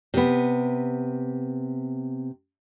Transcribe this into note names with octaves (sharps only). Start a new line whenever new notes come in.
C3 B3